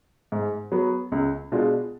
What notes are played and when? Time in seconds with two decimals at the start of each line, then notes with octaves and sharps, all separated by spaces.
0.32 G#2
0.72 F#3 B3
1.12 C#2
1.52 B2 G#3 D4 F4